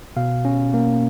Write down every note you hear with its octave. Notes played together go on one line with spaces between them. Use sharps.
B2 F5
C#4
A#3